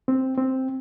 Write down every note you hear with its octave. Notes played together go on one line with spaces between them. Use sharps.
C4
C4